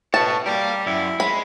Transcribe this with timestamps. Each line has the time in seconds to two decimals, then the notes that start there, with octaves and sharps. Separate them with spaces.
0.14 B2 A4 C#5 A5
0.46 G3 A#4 F5
0.86 F#2 E4
1.20 G#3 B5